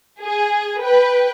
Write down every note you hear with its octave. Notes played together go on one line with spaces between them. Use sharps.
G#4
B4 G5